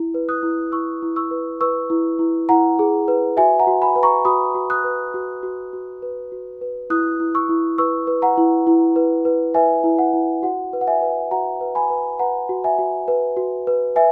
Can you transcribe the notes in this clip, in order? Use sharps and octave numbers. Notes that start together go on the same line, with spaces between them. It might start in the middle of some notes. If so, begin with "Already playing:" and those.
Already playing: E4
B4
D#6 F#6
E4
E4 C#6 E6
E4
C#6 E6
B4
B4 C#6 E6
E4
E4
E4 F#5 A#5
G#4
B4
F#4 E5 G#5
F#5 A#5
F#4
G#5 B5
B4
A#5 C#6
F#4 B5 D#6
F#4
D#6 F#6
B4
F#4
F#4
F#4
B4
F#4
B4
E4 D#6 F#6
E4
C#6 E6
E4
B4 C#6 E6
B4
F#5 A#5
E4
E4
B4
B4
B4 E5 G#5
E4
F#5
E4
F#4 F#5
B4
F#5
E5 G#5
B4
F#4 F#5 A#5
B4
G#5 B5
B4
B4 F#5 A#5
F#4
E5 G#5
F#4
B4
F#4
B4
B4 E5 G#5